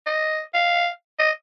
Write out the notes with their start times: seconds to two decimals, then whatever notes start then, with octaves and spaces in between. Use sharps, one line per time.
0.06 D#5
0.54 F5
1.19 D#5